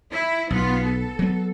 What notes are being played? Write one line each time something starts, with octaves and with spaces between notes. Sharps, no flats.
E4
B1 B3 F4
A4
F#3 B3